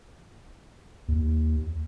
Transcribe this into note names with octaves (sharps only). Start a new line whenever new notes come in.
D#2